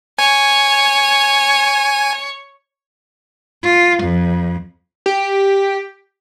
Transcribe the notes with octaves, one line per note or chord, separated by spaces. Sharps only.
C#5 G#5
F4
F2
G4